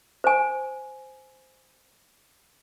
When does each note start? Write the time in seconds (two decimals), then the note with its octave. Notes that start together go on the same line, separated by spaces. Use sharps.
0.24 C5 G#5